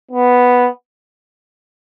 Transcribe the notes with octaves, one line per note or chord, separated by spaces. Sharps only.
B3